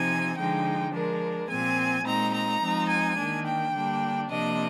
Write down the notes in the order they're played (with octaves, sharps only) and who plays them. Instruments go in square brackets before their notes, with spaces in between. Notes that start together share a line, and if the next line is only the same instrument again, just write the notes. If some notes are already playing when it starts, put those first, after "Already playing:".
Already playing: [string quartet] C3 F3 C4 D#4 G#5
D3 F3 G#3 D#4 G5
F3 G#3 D4 A#4
A#2 F3 C4 G#5
A#2 G#3 C4 D#4 A#5
A#5
F3 G#3 C4 D#4
G#5
D#3 A#3 D4
G5
D3 G3 A#3 D4
C3 F3 A#3 D4 D#5